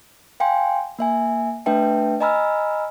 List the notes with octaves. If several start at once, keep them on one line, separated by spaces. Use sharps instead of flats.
F5 G5 G#5 C6
A#3 E5 G#5
A3 D4 B4 E5 G5 A5
D#5 G#5 A#5 B5 E6 F6